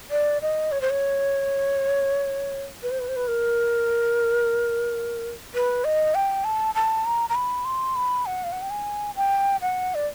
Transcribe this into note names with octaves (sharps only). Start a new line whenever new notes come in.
D5
D#5
C#5
C5
C#5
B4
C5
B4
C5
B4
A#4
B4
D#5
G5
A5
A5
A#5
A#5
B5
C6
B5
F#5
F5
F#5
G5
G#5
G5
F#5
D5